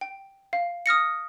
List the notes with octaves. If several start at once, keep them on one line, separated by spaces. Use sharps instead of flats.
G5
F5
D#6 F6 A#6 C#7